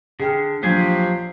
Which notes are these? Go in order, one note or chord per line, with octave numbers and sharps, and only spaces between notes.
D3 G#4 G5 F6
A#1 F3 F#3 G4 C5 G#5